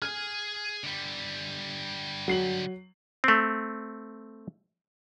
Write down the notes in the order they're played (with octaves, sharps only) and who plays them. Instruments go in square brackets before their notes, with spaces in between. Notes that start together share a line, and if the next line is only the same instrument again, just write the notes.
[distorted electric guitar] G#4 G#5 [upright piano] F6
[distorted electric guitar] D3 G3
[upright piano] F#3 C7 F#7
[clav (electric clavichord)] A3 C4